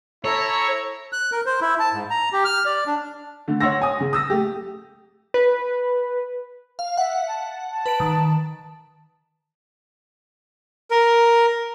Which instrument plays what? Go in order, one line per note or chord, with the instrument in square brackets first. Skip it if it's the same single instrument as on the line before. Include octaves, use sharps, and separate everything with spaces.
[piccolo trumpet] E4 [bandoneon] A4 [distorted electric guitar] C#5 [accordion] A#5
[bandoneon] F#6
A#4
C5
E4
A5
G#2
A#5
G4
F6
D5
D4
[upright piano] D3 A3
C#5 F#5 C6 E6 A#6
G#5 D#6
C#3
D#6 E6 A#6
A3 G4
[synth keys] B4
[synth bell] F5
[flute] E5 [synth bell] F#5
[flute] A5
A5
[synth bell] B4 D7
D#3
[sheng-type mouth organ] A#4